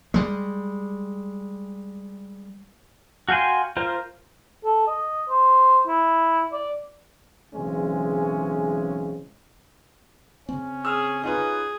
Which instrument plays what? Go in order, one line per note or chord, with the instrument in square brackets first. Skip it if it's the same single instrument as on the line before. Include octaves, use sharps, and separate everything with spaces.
[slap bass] G3 G#3
[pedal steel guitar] F#4 F5 G5 G#5 C6
F4 A#4 C5
[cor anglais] A4
D#5
C5
E4
D5
[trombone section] B1 C#3 E3 G#3 C4 C#4
[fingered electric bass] C#3 C4 [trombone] C#4
[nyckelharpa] G#4 [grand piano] E6 F6
[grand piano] D#4 F4 B4 [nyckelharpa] G#4